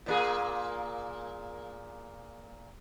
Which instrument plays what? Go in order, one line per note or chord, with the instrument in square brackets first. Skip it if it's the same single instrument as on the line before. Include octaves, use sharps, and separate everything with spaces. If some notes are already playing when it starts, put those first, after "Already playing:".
[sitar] A#2 A#3 G#4